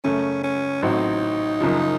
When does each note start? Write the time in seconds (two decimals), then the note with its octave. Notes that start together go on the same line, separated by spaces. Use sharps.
0.04 F#2 C#3 A3 C#4
0.44 C#4
0.82 A1 A2 F#3 C4 D#4
1.61 F#1 F#2 C#3 F3